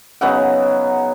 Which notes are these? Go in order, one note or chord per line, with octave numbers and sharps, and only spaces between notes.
C#3 F#3 B3 D#4 F#5